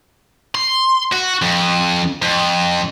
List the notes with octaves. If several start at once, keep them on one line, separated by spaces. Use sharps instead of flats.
C6
F#4
F2
F2